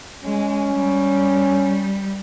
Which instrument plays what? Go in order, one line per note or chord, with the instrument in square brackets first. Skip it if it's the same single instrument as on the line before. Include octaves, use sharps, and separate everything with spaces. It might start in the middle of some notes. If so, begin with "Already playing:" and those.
[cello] G#3 [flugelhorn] C#4
[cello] G3